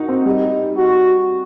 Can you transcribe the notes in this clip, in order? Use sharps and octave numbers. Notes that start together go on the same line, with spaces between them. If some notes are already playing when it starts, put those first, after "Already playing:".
Already playing: D#4 F#4 A#4
C4
G3 D#4
F#4